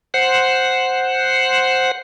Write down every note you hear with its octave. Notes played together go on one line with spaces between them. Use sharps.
C5 F#5